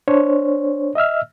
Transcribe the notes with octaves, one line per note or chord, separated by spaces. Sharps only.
D4 C5 C#5
D#5 E5 E6 F6